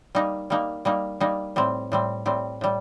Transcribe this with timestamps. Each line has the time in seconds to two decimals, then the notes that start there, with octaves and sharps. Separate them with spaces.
0.15 G3 A#3 D#4
0.50 G3 A#3 D#4
0.85 G3 A#3 D#4
1.20 G3 A#3 D#4
1.56 A2 G3 C4
1.92 A2 G3 C4
2.26 A2 G3 C4
2.61 A2 G3